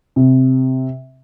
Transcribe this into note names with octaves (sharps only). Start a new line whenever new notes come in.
C3